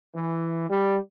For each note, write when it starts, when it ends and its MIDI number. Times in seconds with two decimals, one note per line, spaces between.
0.15 0.67 52
0.70 0.97 55